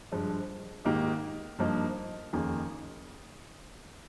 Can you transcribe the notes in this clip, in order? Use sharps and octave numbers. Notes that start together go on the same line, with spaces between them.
G2 F3 G#3
G#2 D#3 A#3 D#4 G4
G2 F3 A#3 D#4
F2 D#3 A#3 C#4 G#4